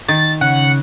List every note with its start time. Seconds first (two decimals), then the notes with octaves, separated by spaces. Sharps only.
0.08 D#3 A6
0.41 C#3 F#5